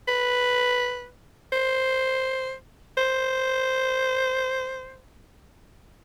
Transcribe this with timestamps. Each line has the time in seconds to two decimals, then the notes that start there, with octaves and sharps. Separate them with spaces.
0.08 B4
1.52 C5
2.97 C5